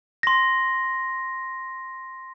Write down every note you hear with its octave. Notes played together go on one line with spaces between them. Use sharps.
C6 A#6